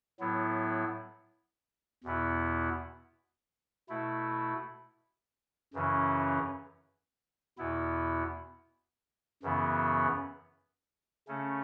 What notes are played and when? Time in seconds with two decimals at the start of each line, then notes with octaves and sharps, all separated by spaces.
0.20 A2 F#3 B3 E4
2.04 E2 B2 B3 E4
3.89 B2 A3 E4
5.74 F#2 C#3 E3 C#4
7.58 E2 B2 B3 E4
9.43 F#2 C#3 E3 B3
11.28 C#3 A3 C#4